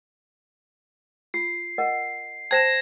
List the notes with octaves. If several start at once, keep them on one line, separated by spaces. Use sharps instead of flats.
F4 C7
A#4 D#5 F#5
C5 G5 A5 G#6 A#6 E7